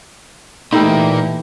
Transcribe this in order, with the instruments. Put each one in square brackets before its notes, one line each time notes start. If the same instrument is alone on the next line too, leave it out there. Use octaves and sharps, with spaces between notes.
[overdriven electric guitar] A#2 A#3 [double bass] E3 A3 [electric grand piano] D#4 [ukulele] G4 A4 B5